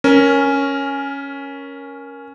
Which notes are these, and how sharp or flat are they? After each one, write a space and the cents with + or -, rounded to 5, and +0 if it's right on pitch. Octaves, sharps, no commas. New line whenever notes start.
C#4 +0 A#4 +10